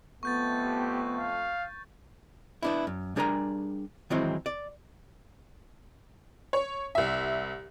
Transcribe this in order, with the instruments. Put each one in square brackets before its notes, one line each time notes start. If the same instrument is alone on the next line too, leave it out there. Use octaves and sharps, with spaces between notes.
[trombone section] F2 A3 [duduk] B3 [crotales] C#6 G6 A6
[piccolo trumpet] G4
F5
[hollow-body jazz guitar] B3 D4 E4
F#2
G3 D4 G#4 A#4 G#5 A#5
D#3 E3 F#3 G#3 C4 E4
D5
[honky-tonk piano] C#5
C2 E5